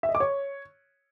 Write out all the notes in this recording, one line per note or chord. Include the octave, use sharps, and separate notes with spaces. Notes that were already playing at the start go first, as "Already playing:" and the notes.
E5
D#5
D6
C#5